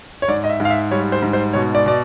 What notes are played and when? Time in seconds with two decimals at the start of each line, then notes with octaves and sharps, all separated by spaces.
0.22 C#5
0.28 G#2 D5
0.44 D#5
0.49 E5
0.60 G#2
0.65 F5
0.70 E5
0.91 G3 C#5
1.12 C5
1.22 G#2
1.33 C5
1.53 B2 C#5
1.75 D5
1.86 B2 D5